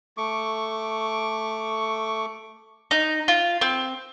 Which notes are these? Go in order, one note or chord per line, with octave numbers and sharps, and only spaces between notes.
A3 C#6 D6
D#4
F4
C4